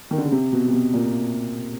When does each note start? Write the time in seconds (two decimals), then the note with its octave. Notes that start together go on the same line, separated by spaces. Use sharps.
0.11 D#3
0.18 D3
0.25 C#3
0.32 C3
0.53 B2
0.68 C3
0.73 B2
0.94 A#2